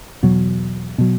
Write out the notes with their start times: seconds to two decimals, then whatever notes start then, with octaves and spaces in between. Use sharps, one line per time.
0.23 E2 B2 F#3
0.98 B2 F#3